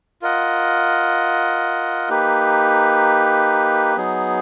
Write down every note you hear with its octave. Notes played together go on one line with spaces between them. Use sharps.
F4 A#4 D#5 F#5
A#3 D#4 G4 B4
F#3 B3 D#4 G#4